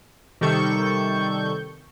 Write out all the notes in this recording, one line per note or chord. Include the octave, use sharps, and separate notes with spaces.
C3 D#3 G3 A4 C#6 G6